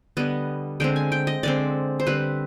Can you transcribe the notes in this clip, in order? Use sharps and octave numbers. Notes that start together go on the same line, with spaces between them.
D3 G3 B3 D#5
D3 G#3 C4 G5
G#5
G5
D#5
D3 G#3 C4 D5
C5
D3 G3 C4 B4